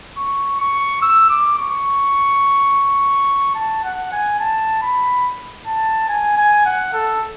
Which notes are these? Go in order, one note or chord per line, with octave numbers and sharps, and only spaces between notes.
C#6
C#6
E6
D6
C#6
A5
F#5
G#5
A5
B5
A5
G#5
G#5
F#5
A4